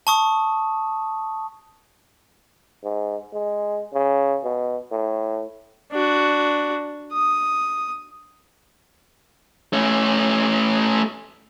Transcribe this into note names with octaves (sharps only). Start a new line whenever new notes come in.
A5 C#6 D#6
G#2
G#3
C#3
B2
A2
D4 F#4
D#6
A3 C#4